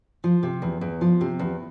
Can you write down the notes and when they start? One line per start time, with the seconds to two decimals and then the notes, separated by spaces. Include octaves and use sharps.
0.24 F3
0.43 C3
0.62 E2
0.81 E2
1.01 F3
1.21 C3
1.39 E2